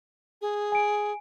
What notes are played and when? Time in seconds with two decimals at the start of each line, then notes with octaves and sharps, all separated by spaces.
0.41 G#4
0.72 G#5 D7